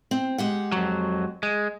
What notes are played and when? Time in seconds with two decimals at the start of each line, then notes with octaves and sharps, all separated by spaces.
0.11 C4
0.38 G#3 G4 F#5
0.72 F2 F#3
1.43 G#3